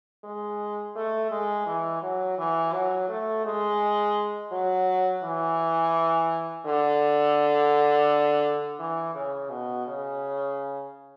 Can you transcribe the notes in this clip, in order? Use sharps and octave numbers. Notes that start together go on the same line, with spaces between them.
G#3
A3
G#3
E3
F#3
E3
F#3
A3
G#3
F#3
E3
D3
E3
C#3
B2
C#3